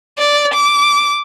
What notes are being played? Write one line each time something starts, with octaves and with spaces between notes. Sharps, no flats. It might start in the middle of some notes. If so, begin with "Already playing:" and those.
D5
D6